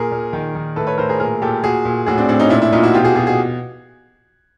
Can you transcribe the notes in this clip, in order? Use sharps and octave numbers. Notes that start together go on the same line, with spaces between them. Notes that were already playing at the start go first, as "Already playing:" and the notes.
Already playing: A#2 G#4 A#4
A#2
D#3
D#3
A2 A4 B4
B4 C#5
A2 A#4 C5
G#4 A#4
A#2 G#4 A#4
A#2 G4 A4
A#2 F#4 G#4
A#2
A2 F#4 G#4
C4 D4
A2 C4 D4
C#4 D#4
A#2 D4 E4
D4 E4
A#2 D#4 F4
E4 F#4
B2 F4 G4
F#4 G#4
B2 F#4 G#4
F#4 G#4